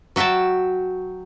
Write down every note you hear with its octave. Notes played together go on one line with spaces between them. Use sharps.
F#3 F#4 E5 G5 A5